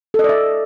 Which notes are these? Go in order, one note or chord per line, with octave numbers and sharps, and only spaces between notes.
A4
D#5
D5
E5